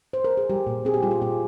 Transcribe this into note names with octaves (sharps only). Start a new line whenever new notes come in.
C5
A#4
G#4
G3 G4
A#2
C4 G#4
G4
G3 F4
G4
A#2 F4